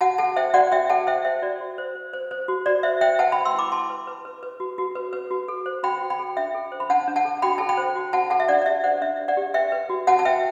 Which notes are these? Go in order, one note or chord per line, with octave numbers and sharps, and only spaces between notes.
F#4 F#5 A5
A4 F#5 A5
C5 E5 G5
F#4 D5 F#5
F#4 E5 G5
A4 F#5 A5
C5 E5 G5
C5 E5
F#4 D5
F#4
C5
C5
C5
C5
F#4
F#4 D5
C5 E5
C5 E5 G5
B4 F#5 A5
B4 G5 B5
C6 E6
E4 B5 D6
E4 A5 C6
B4
B4
B4
B4
F#4
F#4
B4
B4
F#4
A4
C5
F#4 G5 B5
F#4
G5 B5
A4
D4 E5 G5
A4
C5
B5
D4 F#5 A5
D4
F#5 A5
A4
F#4 G5 B5
A4 A5
G5 B5
C5
F#4
F#4 F#5 A5
A4 F#5 A5
E5
D4 D5 F#5
D5
G4 E5
C5 D5 F#5
D4 E5
D4
D5 F#5
G4
B4 E5 G5
B4
F#4
F#4 F#5 A5
A5
B4 E5 G5